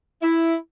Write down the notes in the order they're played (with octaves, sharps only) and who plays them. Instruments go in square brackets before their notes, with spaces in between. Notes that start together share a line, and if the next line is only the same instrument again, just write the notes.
[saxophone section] E4